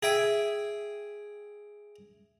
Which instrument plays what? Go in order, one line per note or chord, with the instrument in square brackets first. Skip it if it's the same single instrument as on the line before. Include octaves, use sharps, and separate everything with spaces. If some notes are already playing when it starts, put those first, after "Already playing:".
[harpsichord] G#4 E5 G5 G#5